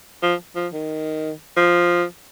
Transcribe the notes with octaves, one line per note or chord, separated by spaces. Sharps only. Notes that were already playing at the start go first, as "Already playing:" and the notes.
F3
F3
D#3
F3